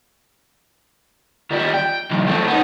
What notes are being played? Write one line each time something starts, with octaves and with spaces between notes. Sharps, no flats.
D#3 G3
G5
B1 E2
A3 C4
B3 D#4